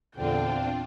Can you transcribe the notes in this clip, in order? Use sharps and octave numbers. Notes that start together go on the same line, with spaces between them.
E2 A#2 D3 C4 D4 F4 G5